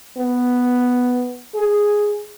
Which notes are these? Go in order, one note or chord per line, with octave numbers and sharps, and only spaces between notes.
B3
G#4